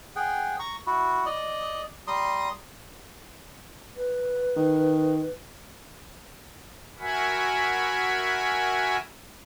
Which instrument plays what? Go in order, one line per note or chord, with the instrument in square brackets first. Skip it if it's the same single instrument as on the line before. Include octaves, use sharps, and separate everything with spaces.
[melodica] G#4 F#5 G5
A#5 C#6
E4 F#4
D5 D#5
G3 A#5 C6 D#6
[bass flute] B4
[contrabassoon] D#3
[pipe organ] F#4 A#4 E5 F#5 G#5 B5